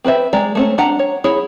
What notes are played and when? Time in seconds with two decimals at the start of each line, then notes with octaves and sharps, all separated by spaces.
0.04 C4 B4 C5 E5
0.33 G#3 D5 A#5
0.55 A3 C4 C#4
0.78 D4 F#5 A#5
0.99 C#5
1.24 E4 G#4 C#5